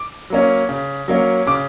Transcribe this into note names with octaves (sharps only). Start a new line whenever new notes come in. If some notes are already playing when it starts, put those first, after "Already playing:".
Already playing: D6
F#3 A#3 C#4
C#3
F#3 A#3 C#4
C#3 D6